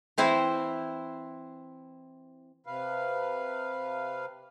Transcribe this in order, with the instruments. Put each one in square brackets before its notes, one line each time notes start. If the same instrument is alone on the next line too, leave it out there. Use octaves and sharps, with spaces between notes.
[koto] E3 C4 E4 C5
[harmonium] C3 B4 F5